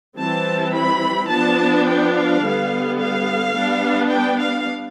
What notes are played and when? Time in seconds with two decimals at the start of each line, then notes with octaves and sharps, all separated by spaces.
0.17 E3 G3 C4 A5
0.74 B5
1.30 F3 B3 D4 A5
1.86 G5
2.15 F5
2.43 D3 G3 B3
2.99 F5
3.56 G3 B3 D4
4.12 G5
4.40 F5